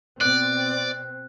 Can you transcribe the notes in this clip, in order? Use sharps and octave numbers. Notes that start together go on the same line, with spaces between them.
B2 C4 D5 F#6